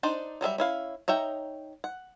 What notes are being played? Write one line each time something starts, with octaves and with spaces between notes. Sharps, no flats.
D4 D#4 C5 D5
F#3 G3 A4 E5
C#4 E4 F5
D#4 C#5 E5 G5 A#5
F#5